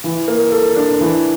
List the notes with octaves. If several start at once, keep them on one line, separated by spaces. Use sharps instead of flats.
E3
A#3
A4
D4
E3